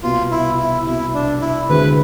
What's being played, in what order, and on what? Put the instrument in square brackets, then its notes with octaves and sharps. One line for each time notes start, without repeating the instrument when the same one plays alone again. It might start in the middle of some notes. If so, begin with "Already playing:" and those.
[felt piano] C2 B2 B3 [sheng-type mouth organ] F4
[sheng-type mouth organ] E4
E4
[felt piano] C2 B2 B3 [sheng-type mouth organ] E4
[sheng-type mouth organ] D4
E4
[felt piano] D2 D3 G#3 C4 [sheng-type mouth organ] B4